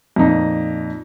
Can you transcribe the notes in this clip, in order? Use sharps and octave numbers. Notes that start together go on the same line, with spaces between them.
F2 A#2 D#4